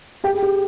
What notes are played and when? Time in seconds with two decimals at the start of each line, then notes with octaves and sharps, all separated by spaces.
0.24 G4 G5
0.33 G#4
0.42 G4